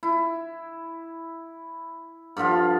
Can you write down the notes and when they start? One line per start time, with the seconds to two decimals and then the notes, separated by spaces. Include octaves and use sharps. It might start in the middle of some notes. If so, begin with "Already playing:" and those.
0.03 E4
2.37 G2 D3 F3 F4